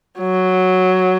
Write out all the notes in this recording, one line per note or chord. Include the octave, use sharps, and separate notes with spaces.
F#3